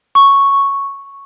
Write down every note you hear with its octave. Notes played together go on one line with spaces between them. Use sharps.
C#6